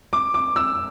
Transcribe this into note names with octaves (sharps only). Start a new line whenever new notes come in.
D6
D6
E6